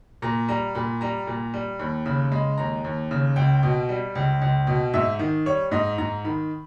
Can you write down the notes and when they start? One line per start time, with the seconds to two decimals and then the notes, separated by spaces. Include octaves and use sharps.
0.22 A#2 A#5
0.48 G3 A#5
0.75 A#2 B5
1.01 G3 A#5
1.27 A#2
1.54 G3
1.79 D#2 B5
2.06 C#3 B5
2.32 G#3 B5
2.58 D#2 A#5
2.85 D#2
3.11 C#3
3.36 C#2 G5
3.63 B2
3.89 G3
4.15 C#2
4.41 C#2
4.67 B2
4.94 G#2 E5
5.19 D#3
5.46 G3 C#5
5.72 G#2 D#5
5.98 G#2 A#5
6.25 D#3 B5